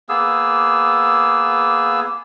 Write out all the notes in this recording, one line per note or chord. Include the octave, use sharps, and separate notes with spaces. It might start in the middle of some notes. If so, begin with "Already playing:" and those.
A#3 B3 G#4 E6